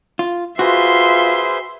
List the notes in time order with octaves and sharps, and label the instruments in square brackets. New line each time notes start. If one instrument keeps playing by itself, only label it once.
[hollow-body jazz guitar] F4
[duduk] F4 [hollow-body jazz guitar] F#4 [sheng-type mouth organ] G#4 B4 C5 [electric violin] E5 C6